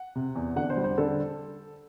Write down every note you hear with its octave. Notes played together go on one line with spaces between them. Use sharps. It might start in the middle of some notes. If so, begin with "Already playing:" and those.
Already playing: F#5
C3
E2
D3 F#5
C5
G3
C5
D3 A4